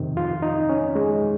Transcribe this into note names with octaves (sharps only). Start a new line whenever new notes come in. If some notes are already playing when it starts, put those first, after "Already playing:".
Already playing: F2 C3 D#3
F4
D#4
C#4
G#3